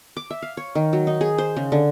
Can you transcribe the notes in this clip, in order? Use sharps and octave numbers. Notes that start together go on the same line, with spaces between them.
D6
E5
F5
C#5
D#3
F#3
D#4
G#4
C5
C#3
D3